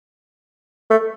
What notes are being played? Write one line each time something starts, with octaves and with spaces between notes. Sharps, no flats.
A3